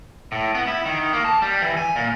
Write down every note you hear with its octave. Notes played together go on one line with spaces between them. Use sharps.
A2
B3
E4
D#3
A#3
A5
G3
E3
G#5
A#2